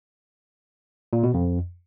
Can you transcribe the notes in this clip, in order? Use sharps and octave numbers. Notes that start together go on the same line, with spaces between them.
A#2
B2
F2